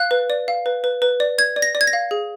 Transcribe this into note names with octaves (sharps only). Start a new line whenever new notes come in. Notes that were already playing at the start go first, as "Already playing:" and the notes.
Already playing: F5 F#6
B4
D5
F5
B4
B4
B4
D5
D5 G#6
D5
A#6
D5
G#6
A#6
F5
G#4